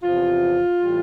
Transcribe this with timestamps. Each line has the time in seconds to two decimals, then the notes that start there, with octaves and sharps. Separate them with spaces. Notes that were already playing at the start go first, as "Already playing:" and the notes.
0.03 E2 C3 F3 F4
0.81 A2 E3 G3